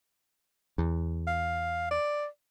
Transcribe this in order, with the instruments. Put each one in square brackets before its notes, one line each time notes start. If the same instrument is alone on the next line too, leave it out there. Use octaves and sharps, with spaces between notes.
[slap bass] E2
[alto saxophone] F5
D5